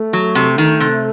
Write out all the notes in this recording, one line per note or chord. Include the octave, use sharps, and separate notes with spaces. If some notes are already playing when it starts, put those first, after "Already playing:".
Already playing: A3
F#3
C3
D#3
C3